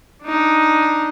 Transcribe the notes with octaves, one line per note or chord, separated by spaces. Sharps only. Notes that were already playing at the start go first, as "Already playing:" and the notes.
D4 D#4